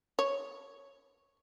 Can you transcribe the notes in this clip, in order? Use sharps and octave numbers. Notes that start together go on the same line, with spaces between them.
C#5